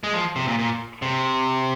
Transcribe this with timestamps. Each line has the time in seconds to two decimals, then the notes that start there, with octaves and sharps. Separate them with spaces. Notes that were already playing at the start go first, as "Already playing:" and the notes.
0.04 G#3
0.14 F3
0.36 C3
0.48 A#2
0.59 A#2
1.02 C3